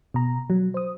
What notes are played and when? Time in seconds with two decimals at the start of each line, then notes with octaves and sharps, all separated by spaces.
0.14 B2 A#5
0.50 F#3
0.74 C5 D#6